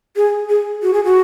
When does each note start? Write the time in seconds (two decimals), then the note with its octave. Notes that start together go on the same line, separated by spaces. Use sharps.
0.16 G#4
0.49 G#4
0.82 F#4
0.94 G#4
1.04 F#4